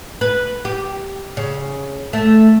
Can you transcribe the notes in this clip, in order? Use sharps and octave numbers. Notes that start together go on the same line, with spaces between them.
B4
G4
C#3
A3